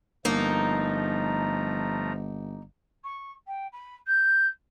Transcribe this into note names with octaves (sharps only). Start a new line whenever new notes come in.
G1 F3 A3 A#3 D#4 A#5
C#6
G5
B5
G6